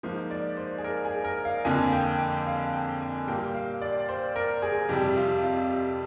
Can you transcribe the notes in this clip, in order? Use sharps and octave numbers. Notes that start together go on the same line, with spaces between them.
G#2 F3 A#3 C5
D5
C5
G#4
A#4
G#4
A#4
F5
F2 D3 F3 A#3 G#5
G5
G5
F5
G5
G#5
A#2 G3 A#3 G5
F5
D5
C5
A#4
G#4
F2 C3 G3 G4
F4
F4
G4